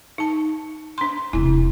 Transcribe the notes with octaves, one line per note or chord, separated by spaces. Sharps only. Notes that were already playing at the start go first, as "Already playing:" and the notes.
D#4 A5
D4 C6
E1 C3 E4